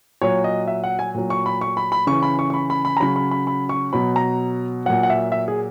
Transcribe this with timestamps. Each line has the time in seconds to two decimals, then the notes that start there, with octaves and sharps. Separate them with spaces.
0.21 A#2 F#3 C#5
0.44 D#5
0.68 E5
0.84 F#5
0.99 G#5
1.14 A#2 F#3
1.30 C#6
1.46 B5
1.61 C#6
1.77 B5
1.92 B5
2.07 C#3 E3 C#6
2.22 B5
2.39 C#6
2.50 C#6
2.54 B5
2.70 B5
2.85 B5
2.97 A#5
3.00 C#3 F#3 B5
3.16 B5
3.31 B5
3.47 B5
3.69 C#6
3.93 B2 F#3 B5
4.16 A#5
4.86 A#2 F#3 F#5
5.03 F#5
5.10 E5
5.32 E5
5.48 G#4